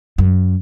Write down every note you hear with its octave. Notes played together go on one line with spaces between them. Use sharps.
F#2